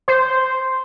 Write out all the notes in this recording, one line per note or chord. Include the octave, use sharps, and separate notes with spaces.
C5